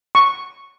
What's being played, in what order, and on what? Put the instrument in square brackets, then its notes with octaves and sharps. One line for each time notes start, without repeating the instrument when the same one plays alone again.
[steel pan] C#6